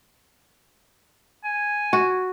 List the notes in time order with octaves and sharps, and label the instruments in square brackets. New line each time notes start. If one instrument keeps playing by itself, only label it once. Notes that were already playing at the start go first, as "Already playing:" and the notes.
[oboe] G#5
[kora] F#4